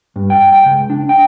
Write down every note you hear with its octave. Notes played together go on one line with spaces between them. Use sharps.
G2
G5
G5
C#2
D4
G5